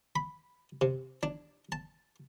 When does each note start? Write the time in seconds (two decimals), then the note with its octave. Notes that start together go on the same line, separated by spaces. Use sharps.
0.16 B5
0.81 C3
1.23 D4
1.72 A5